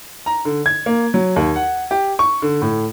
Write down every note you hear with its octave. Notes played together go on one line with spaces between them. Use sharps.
A#5
D3
G#6
A#3
F#3
D#2
F#5
G4
C#6
D3
A2